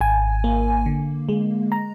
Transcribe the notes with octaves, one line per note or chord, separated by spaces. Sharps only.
G#1 G#5
A#3
D3
G#3
A#5